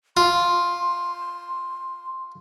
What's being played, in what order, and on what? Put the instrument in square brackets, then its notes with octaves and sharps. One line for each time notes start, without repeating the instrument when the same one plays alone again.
[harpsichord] F4 [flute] C6